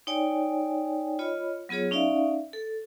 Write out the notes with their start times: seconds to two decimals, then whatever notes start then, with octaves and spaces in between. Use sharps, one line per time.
0.07 D#4 C#5 D5 G5 G#5
1.19 F4 C#5 D#5 B5
1.69 F#3 B3 F4 G#4 C#5
1.91 C#4 D#4 D5 E5 F5
2.53 A4